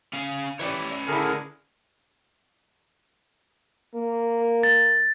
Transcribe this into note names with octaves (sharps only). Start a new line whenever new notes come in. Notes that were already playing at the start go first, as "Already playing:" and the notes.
C#4 F5
E3 G3 C#4 B4 C#5 D5
A2 D3 E4 G#4 A#4
A#3
A6